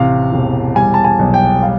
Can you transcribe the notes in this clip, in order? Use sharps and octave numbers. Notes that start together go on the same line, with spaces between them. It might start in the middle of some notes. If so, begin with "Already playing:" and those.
Already playing: A1 C3 F5
E1
G3 G#5
A5
G#5
B1
G5
G3 F5